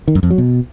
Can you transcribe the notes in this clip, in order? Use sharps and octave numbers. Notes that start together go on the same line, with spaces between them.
D#3
F#2
F2
F#3
B2